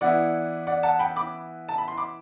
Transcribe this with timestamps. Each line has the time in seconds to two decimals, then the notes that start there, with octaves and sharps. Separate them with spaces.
0.01 E3 B3 E4 D5 F#5
0.67 D5 F#5
0.83 F#5 A5
0.99 G5 B5
1.16 B5 D6
1.69 A5
1.78 B5
1.88 C6
1.97 B5 D6